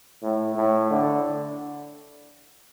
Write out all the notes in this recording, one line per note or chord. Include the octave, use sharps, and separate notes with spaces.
A2
A2
D3